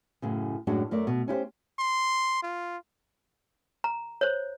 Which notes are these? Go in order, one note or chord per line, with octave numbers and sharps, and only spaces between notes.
F#2 A2 C#3
F#2 A2 G#3 D4 F#4
F#2 A3 A#4 D5
B2
C#4 E4 G4 C5
C6
F4
A#5
C5 C#5